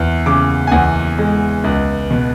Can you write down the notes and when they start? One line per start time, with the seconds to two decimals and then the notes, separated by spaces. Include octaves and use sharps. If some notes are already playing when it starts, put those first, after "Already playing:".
Already playing: E2
0.26 C#3 D6
0.67 G#5
0.72 E2 F#5
1.18 G#3
1.64 C#2
2.11 B2